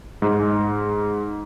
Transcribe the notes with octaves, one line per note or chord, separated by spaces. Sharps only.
G#2